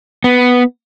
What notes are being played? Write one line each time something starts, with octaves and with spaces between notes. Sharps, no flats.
B3